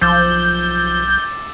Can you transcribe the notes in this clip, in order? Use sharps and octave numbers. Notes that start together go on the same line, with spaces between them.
B1 F3 D6 E6 G6 A6